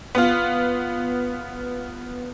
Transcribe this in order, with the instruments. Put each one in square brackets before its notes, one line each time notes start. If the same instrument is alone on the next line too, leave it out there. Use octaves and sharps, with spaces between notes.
[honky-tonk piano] B3 F4